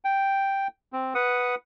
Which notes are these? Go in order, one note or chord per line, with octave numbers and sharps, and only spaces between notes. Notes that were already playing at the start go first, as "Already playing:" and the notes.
G5
C4
B4 F#5 D#6